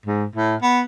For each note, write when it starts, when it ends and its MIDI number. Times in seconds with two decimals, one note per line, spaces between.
0.06 0.26 44
0.35 0.55 45
0.62 0.82 59